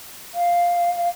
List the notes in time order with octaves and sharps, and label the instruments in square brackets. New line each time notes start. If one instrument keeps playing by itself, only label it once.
[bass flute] F5